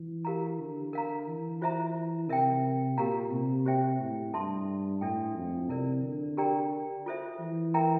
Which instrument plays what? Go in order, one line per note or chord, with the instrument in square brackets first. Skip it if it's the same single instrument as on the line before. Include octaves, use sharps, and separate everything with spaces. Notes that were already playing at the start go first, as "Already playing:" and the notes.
Already playing: [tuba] E3
[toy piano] G4 A#4 F5 A#5
[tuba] D3
[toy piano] A#4 F5 A#5
[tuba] E3
[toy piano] F4 C5 E5 A#5
[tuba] C3 [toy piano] A#4 E5 G5
[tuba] A#2 [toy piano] G4 A#4 F5 A#5
[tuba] C3
[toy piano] G4 C5 E5 G5
[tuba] A2
[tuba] G2 [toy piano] A4 E5 A5 C6
[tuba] A2 [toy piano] D4 A4 E5 G5
[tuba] F2
[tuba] C3 [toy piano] E4 A#4 D5
[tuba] D3
[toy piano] G4 A#4 D5 G5 A#5
F4 A4 C5 E5
[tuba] E3
[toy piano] A#4 E5 G5 A#5